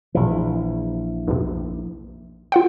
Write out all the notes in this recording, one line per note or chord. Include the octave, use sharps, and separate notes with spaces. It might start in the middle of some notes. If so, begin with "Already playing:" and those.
A#1 E3
B1 F2 C3
F4 F#5 G5